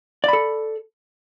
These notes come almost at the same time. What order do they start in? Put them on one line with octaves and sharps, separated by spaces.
D5 B5 A4